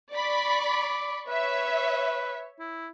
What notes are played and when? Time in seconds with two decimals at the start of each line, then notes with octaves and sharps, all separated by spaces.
0.14 D5 B5 C#6
0.68 D6
1.28 B4 C#5 E5
2.59 E4